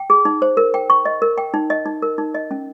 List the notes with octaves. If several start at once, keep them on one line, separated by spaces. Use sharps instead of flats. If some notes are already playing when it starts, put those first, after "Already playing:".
Already playing: G5
G#4
D#4
C5
A#4
G5
C#6
D#5
A#4
G5
D#4
D#5
D#4
A#4
D#4
D#5
C#4